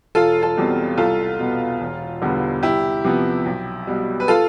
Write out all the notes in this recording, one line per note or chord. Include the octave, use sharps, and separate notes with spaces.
E1 F4 A4
F4 A4
E2 B2 G3 C4
C2 F4 A4
B2 B3
E1
E2 D3 G3 B3
C2 E4 G4
C3 F3 B3
B1
B2 G3
B4
F4 A4